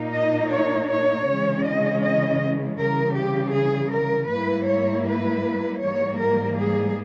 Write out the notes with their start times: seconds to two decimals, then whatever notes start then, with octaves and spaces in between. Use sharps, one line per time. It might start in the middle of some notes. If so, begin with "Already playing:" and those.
Already playing: A#2 A#3 D#4
0.13 D#5
0.50 C#5
0.89 C#5
1.27 C#3 E3 G#3 C#4
1.65 D#5
2.03 D#5
2.79 C#3 E3 G3 A#4
3.18 G4
3.55 G#4
3.93 A#4
4.31 G#2 G3 A#3 E4 B4
4.69 C#5
5.08 B4
5.83 G#2 E3 G3 A#3 C#5
6.22 A#4
6.60 G#4